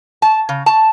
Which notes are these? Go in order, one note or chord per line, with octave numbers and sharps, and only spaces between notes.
A5
C#3
A5